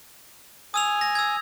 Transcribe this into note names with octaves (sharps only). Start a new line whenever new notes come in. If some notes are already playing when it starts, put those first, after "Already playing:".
G#5 D#6 E6 F7
A#6
E6 G#6